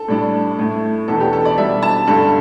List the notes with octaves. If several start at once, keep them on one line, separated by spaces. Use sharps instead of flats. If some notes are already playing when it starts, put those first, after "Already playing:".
Already playing: A4
A2 G3 D4
A2 A3 E4
E2 B2 B3 D4 A4
G4
A4
D5
B2 G3 D4 E5
A5
G2 D3 G3 A4